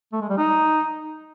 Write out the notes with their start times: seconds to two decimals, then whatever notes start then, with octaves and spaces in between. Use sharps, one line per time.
0.13 A3
0.21 G#3
0.30 G3
0.38 D#4